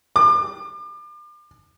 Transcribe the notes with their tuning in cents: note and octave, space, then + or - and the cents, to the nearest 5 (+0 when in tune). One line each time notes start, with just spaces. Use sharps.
D6 +35